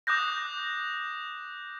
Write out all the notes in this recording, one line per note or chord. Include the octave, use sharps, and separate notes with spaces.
D6 D#6 F#6 G6 A#6